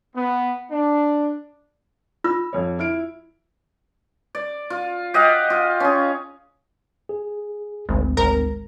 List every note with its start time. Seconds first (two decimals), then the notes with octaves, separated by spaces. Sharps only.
0.16 B3
0.71 D4
2.24 F4 E6
2.53 F2 C#5
2.79 E4 F6 D7
4.35 D5
4.70 F4
5.14 G4 D#5 F5 F#5
5.50 F4
5.80 C#4 G#4
7.09 G#4
7.89 G#1 D2
8.17 G#1 A#4 A#5